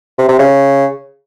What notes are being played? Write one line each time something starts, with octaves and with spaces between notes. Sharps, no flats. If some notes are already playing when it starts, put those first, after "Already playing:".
C3
C3
C#3